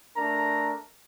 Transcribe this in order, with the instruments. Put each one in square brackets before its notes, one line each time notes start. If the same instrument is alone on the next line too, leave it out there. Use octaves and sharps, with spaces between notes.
[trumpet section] A3 D4 A#4 A#5